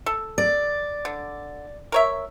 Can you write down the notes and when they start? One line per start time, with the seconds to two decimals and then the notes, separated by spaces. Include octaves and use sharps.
0.06 A4
0.38 D5
1.05 D3
1.92 A#4 C#5 E5